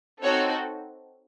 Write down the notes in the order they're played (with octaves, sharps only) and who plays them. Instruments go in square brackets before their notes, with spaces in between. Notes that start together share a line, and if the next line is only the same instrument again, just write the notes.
[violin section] C4 D#4 F#4 A4 C#5